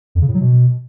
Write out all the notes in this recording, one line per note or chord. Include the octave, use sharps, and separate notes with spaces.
F2
C#3
A2
F#3
B2